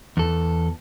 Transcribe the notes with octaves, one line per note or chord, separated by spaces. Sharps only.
E2 A4